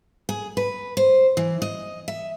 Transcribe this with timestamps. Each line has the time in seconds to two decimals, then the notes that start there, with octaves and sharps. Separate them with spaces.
0.29 G#4
0.57 B4
0.97 C5
1.37 E3
1.62 D#5
2.08 E5